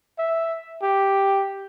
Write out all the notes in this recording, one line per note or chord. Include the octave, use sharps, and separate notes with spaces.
E5
G4